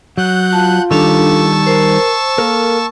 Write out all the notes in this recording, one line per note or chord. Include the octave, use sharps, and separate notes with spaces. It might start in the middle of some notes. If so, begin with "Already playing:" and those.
F#3 F#5 F#6 G6
F4 A5
D#3 G3 D4 A4 A5 C#6 E6
A#4 C5
A#3 A4 A#4